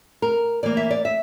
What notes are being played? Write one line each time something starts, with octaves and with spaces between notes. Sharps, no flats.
A#4
E3 A#3 D5
E5
D5
E5